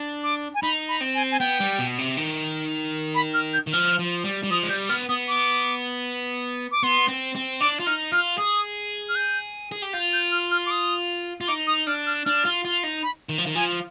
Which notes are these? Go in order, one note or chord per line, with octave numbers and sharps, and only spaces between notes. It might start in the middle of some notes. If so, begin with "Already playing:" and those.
Already playing: D4
D6
G#5
D#4 B5
B5
C4
G#5
G#5
B3 G5
G3
B2
C3
D#3
B5
F6
G6
D#3
F3 F6
F3
G3
G3
F3 D#6
G#3
G3 G6
B3 F6
B3 D#6
D6
D6
B3 C6
C4
C4
D4 D6
F4
D#4 F6
F4 F6
G#4 D#6
F6
G6
G#4
G4
F4 G6
G6
F6
F6
D6
D#6
F4
D#4 D6
D#6
D4 F6
F6
D4 F6
F4
F4
D#4
B5
D#3
F3
D#3
F3 G#5